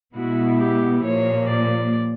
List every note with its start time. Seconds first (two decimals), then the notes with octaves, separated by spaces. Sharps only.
0.14 B2 G#3 B3 E4 F#4
0.59 G4
1.04 A#2 F3 A#3 C#5
1.49 D5